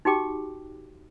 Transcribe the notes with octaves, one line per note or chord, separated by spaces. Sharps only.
D#4 F#4 G4 G5 D6